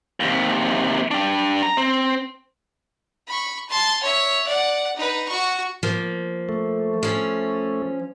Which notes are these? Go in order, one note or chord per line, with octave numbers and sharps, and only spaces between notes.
D#2 C3
D4 G4
A#5
C4
B5 C#6
A5 C6
C#5 E5
D5 F#5
D#4 B4
F#4 C#6
F3 A#3
A3
F3 C#4